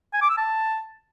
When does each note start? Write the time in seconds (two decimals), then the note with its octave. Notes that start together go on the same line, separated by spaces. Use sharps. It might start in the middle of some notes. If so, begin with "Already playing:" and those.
0.13 G#5
0.21 D6
0.30 E6
0.38 A5